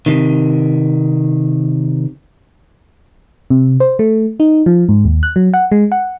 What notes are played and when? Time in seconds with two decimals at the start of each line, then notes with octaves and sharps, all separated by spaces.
0.06 C3 D#3
3.50 C3
3.80 C5
3.99 A3
4.40 D#4
4.66 F3
4.89 G#2
5.05 D#2
5.23 F#6
5.36 F#3
5.54 F#5
5.72 G#3
5.92 F#5